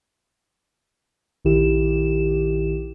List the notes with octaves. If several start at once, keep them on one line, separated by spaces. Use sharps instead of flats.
A#1 D#3 E4 G4 E7